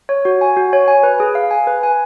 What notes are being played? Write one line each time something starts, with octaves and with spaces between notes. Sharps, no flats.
C#5
F#4
G#5
F#4
C#5
G#5
B4
G#4
F5
G#5
B4
G#5